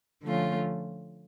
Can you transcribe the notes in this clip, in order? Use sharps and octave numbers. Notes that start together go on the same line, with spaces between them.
D3 F3 A3 C#4 F4